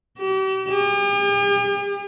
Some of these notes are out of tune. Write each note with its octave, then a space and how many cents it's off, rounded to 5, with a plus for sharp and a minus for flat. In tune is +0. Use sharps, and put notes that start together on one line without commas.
G4 -40
G4 +45